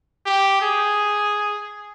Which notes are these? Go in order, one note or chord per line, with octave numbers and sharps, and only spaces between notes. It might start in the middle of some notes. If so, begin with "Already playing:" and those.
G4
G#4